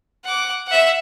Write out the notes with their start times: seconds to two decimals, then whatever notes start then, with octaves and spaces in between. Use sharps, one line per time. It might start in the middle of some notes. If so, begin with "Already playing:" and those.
0.25 F#5 D6
0.67 E5 F#5